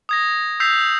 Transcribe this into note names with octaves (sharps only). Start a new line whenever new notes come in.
D#6 G#6 A#6
E6 G6 B6 C7 F7